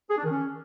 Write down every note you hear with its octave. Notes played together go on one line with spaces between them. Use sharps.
G#4
D4
D#3
C#4